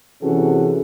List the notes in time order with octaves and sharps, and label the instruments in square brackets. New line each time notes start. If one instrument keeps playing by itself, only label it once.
[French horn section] C3 E3 C#4 F#4 G#4 A4